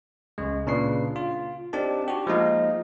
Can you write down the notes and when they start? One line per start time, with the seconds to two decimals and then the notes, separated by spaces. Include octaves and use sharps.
0.38 C#2 C#3 G#3
0.67 A#2 C#3 D4 B4 C7
1.16 F4
1.73 C4 D4 D#4 G4 A#4 A5
2.08 F#4 G4
2.27 F3 G#3 A#3 D#4 D#5 F5